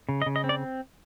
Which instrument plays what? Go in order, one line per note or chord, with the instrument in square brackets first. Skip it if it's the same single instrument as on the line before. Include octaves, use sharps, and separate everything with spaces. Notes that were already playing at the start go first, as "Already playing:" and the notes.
[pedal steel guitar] C#3
D#5
C#3
D#5
C4
D5